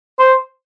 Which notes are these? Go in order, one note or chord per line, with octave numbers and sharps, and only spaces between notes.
C5